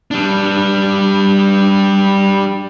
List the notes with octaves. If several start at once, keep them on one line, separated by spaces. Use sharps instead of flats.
G3 D4